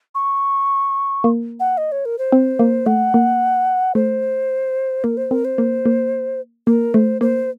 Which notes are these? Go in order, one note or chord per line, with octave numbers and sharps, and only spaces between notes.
C#6
A#3
F#5
D#5
C#5
A#4
C5
C4
A#3
A3 F#5
A#3
A3 C5
A#3 A#4
C5
C4 A#4
C5
A#3
A#3
A#3 A#4
A3 C5
A#3 C5